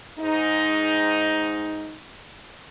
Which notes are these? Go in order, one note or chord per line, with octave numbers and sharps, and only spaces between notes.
G#2 D#4